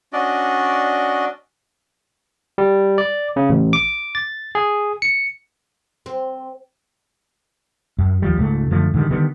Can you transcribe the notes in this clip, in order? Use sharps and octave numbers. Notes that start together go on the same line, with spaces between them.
C#4 D4 F#4 D5 D#5
G3
D5
C#3
A1
D6
A6
G#4
C#7
C4
F#2
D#2 F3 G3
C#2 G#2 A3
F#2 D3 F3 A3
G#2 D3 D#3 G3
D3 D#3 G3 B3